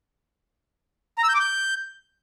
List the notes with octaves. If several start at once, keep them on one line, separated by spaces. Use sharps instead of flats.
A#5
E6
G6
D6
G6